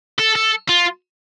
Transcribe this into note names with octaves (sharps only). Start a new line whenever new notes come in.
A4
A4
F4